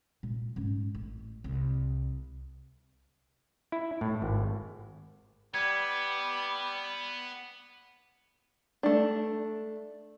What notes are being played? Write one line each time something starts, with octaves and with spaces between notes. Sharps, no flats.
A#2
G#2 C#4
A1
C2
E4
A2
G#1
G3 B3 G#6
A3 D4